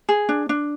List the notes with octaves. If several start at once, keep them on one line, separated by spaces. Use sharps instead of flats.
G#4
D4
D4